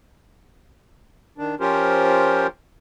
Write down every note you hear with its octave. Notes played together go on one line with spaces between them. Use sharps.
D#3 D4
F3 C#4 F4 G4 A#4 C5